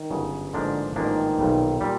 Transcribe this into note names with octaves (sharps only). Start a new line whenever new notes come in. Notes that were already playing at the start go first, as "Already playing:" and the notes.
Already playing: D#3
G1 F#2 C#3
A1 G#2 D3 F3 A#3 D4
A1 G#2 D#3 F3 A#3 D4
B1 A#2 G3
A#2 G3